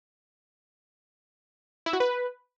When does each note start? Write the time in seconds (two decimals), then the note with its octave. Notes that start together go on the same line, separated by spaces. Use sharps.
1.86 E4
1.93 F#4
2.00 B4